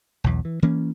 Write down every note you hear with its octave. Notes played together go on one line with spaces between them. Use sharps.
B1 E2
E3
E3 A#3 C#4